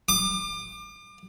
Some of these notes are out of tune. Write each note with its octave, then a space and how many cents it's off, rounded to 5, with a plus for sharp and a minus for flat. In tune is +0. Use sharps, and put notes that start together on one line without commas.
D6 +35